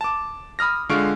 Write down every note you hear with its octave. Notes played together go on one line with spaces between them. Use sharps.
A5 D6
B5 D#6 F6 A#6
D3 G#3 F4 C#6 F6 D7